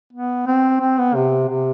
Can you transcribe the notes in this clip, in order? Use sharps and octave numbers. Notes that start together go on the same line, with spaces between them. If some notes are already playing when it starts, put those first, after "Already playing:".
B3
C4
C4
B3
C3
C3